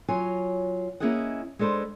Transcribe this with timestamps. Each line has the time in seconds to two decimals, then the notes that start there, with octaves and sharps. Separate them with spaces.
0.08 F#3 F4 C#5 G#5
1.00 A#3 C#4 E4 G#4 D#5 F#5
1.59 G#3 D4 A4 B4 C5